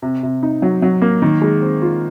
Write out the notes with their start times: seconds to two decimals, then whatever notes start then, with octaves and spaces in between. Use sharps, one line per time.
0.02 C3
0.23 C3
0.43 D#4
0.62 F#3
0.82 F#3
1.02 A#3
1.22 D#3
1.42 G#3
1.62 C4
1.82 F4